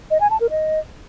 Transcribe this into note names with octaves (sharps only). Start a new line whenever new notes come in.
D#5
G#5
A5
A#4
D#5